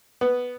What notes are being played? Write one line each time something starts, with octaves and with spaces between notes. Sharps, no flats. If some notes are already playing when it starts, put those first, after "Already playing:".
B3